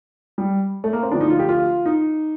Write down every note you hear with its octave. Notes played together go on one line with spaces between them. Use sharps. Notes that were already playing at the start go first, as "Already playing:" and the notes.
G3
A3
A#3
C4
D2 D3 F3 D4
D#4
F4
G4
F4
D#4